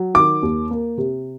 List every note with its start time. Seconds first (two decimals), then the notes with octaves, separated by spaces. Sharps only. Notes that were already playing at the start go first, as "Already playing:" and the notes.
Already playing: F#3
0.14 D#3 D6
0.42 D#2
0.71 A#3
0.98 C3